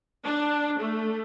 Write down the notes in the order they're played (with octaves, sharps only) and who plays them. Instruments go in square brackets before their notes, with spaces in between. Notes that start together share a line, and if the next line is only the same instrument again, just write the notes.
[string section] D4
A3